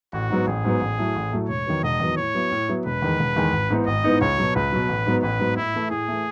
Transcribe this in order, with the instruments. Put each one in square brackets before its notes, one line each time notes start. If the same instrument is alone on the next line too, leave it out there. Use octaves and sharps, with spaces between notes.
[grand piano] A1 [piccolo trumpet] F#4
[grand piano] G#2 F#3 B3
[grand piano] A1 [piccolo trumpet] G#4
[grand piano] G#2 F#3 B3
A1
A2 F#3 A3
A1
A2 F#3 A3
[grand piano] E1 [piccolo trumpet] C#5
[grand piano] E2 D#3 F#3 B3
[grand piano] E1 [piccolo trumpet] D#5
[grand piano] E2 D#3 F#3 B3
[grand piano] A2 [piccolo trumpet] C#5
[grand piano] F#3 B3 E4
A2
F#3 B3 E4
[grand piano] E1 [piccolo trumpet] B4
[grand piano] E2 D#3 G#3
E1
E2 D#3 G#3
G#1
G#2 E3 B3 D#4
[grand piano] G#1 [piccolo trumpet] D#5
[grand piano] G#2 E3 B3 D#4
[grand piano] C#2 [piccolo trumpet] C#5
[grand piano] B2 F#3
[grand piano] C#2 [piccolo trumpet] B4
[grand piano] B2 F#3
A1
G#2 F#3 B3
[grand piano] A1 [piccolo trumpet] B4
[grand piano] G#2 F#3 B3
[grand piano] A2 [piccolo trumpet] E4
[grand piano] E3 A3
[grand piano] A2 [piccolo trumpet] G#4
[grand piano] E3 A3